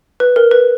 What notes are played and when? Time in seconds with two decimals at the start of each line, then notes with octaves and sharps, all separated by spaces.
0.20 B4
0.36 A#4
0.51 B4